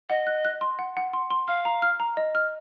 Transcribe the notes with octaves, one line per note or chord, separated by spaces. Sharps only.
D#5 F#5
F#6
F#6
C6
F#5
F#5
C6
C6
F5 F6
A#5
F6
A#5
D#5
F6